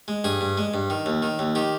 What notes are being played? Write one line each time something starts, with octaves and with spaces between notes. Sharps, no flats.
G#3
G2 G#4
G2
G#3
G2
D#3
D#2
D#3
D#2
D#3 G4